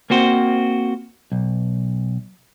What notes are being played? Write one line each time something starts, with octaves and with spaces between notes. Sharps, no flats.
A#3 C4 F#4 C5
B1